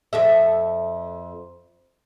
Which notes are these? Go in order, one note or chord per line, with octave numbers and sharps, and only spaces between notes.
F2 A4 E5